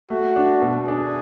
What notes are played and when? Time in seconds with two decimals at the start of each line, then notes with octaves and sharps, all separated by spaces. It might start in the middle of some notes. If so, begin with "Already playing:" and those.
0.10 A3 F#4
0.36 D4
0.62 B2
0.88 D4 G#4